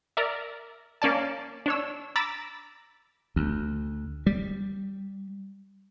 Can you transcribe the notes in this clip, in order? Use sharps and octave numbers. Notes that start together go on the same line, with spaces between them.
A#4 D5 E5
A#3 C#4 D5 A5
D4 C#5 E6
A#5 B5 D6 E6 A6 B6
D2
G3